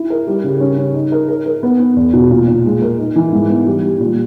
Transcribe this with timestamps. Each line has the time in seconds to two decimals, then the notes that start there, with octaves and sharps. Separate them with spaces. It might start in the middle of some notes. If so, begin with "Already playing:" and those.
Already playing: E4
0.10 A#4
0.27 G3
0.44 C#3
0.60 C#4
0.78 C#4
0.94 D#4
1.12 A#4
1.28 A#4
1.46 A#4
1.63 B3
1.80 B3
1.97 E2
2.13 B2
2.31 A#2
2.47 A#2
2.65 G#3
2.82 A#4
2.98 D#4
3.16 E3
3.33 G#2
3.50 B3
3.66 G3
3.83 G3
4.00 A#2